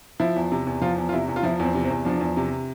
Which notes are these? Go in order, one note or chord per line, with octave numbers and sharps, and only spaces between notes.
F3 E4
E2
C3
E2
F3 F4
E2
F4
C3 E4
E2
F4
F3 E4
E2 C4
C3
C4
E2
F3 D4
E2
C3